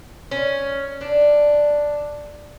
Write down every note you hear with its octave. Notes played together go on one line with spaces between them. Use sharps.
C#4
D4